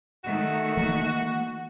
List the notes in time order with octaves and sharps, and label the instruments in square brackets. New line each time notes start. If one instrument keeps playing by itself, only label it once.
[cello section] D#3 A3 [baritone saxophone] F#4
[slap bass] E3 A#3